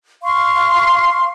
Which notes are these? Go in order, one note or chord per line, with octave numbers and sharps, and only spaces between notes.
F5 C6 C#6